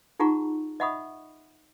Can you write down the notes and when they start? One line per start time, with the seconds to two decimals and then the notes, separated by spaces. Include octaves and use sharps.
0.20 D#4 F4 G#4 F#5 A#5 C#6
0.80 D#5 E5 F#5 B5 C#6 D#6